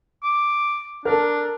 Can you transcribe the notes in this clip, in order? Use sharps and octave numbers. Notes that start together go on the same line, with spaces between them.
D6
D4 A4 A#4